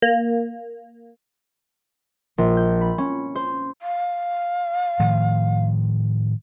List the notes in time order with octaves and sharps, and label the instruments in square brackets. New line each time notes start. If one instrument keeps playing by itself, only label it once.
[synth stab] A#3
[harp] A#1
G6
B5
C#4
C5
[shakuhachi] F5
[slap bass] A2 D#3 F3